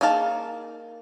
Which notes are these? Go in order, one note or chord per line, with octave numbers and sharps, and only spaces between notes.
A#3 D#4 G#4 F5 A5